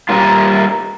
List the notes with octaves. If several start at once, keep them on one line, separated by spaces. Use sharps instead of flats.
G3 A#3 F4